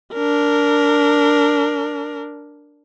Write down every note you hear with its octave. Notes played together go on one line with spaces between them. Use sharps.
D4 A#4